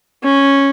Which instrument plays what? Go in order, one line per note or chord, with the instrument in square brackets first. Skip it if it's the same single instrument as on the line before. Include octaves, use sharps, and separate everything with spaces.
[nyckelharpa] C#4